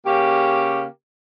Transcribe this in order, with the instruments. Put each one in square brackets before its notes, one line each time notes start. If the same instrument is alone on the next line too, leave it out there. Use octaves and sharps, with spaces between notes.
[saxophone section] C#3 A#3 C#4 G4